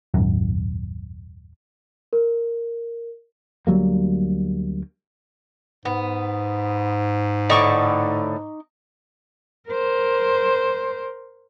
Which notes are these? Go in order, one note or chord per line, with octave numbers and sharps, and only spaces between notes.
D#1 G#1 F#2
A#4
D2 F#3 G3 A#3
G#2 B3
A2 D3 D#4 C#6 D6
A#4 C5